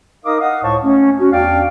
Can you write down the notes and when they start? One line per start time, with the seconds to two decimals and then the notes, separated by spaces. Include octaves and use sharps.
0.25 D#4 A#4 D#5 F5 D6 D#6
0.40 D#5 F5 F#5 D#6
0.63 C#2 A2 C5 C#5 A5 C#6
0.83 A3 C#4
1.19 C#4 F#4
1.32 E2 D4 D5 F5 G5